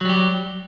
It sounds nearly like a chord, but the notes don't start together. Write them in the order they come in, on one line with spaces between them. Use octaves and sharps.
F#3 G3 G4